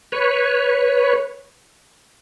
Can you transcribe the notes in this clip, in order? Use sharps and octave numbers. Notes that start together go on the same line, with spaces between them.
B4 C#5